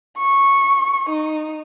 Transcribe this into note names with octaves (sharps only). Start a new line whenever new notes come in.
C#6
D#4